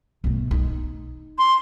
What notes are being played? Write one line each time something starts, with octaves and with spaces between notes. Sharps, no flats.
B1 A3
D#4
C6